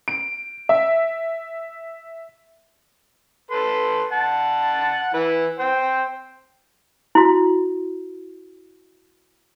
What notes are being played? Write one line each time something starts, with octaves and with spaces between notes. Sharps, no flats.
D7
E5
A4 B4 C6
F#5 A5
E3 B4
C5 G5
E4 F#4